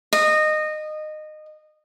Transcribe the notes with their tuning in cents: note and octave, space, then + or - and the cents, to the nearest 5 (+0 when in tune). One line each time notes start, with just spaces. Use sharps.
D#5 -20